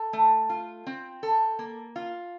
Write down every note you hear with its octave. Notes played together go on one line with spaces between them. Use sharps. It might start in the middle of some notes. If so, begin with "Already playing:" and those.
Already playing: A4
A3
F4
C4
A4
A#3
F4